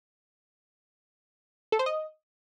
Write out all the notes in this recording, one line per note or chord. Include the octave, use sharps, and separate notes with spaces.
A4
C5
D#5